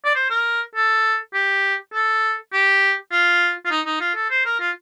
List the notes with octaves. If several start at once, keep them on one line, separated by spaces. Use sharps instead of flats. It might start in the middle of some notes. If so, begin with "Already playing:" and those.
D5
C5
A#4
A4
G4
A4
G4
F4
F4
D#4
D#4
F4
A4
C5
A#4
F4